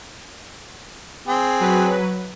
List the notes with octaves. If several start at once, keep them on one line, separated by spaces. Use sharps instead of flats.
C4 G#4
F#3 B4